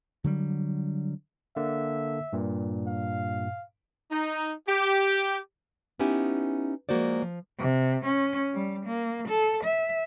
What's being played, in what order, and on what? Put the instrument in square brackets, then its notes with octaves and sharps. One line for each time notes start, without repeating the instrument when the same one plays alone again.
[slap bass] D3 F#3 G3
[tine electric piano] D3 A#3 [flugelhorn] E5
[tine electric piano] G2 A#2
[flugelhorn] F5
[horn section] D#4
G4
[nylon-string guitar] B3 C#4 D#4 E4 G4 G#5
F3 G#3 A#3 F#4 C5 D5
F3
[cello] C3
C#4
G3
A#3
A4
E5